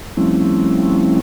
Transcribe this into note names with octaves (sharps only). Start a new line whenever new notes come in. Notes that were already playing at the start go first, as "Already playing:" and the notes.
F3 G3 A3 C4 C#4 E4